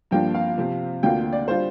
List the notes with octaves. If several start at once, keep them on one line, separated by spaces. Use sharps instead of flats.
G2 F3 A#3 D4 F4 G5
F5
C3 F3 C4
D2 D3 A#3 F4 G5
D5
G3 D4 F4 C5